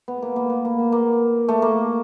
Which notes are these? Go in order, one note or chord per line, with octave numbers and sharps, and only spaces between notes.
B3
A#3
A#3
B3
A#3
A#3
A#3
A3
A#3